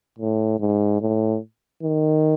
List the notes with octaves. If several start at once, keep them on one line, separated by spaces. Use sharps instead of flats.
A2
G#2
A2
D#3